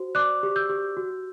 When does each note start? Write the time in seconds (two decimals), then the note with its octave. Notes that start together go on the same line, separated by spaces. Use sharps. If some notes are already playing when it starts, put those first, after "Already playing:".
Already playing: F#4 C5
0.15 D5 D6 F#6
0.43 G4
0.56 E6 G6
0.69 G4
0.97 F#4